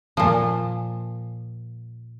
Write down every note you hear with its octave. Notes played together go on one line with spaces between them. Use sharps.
A#2 F3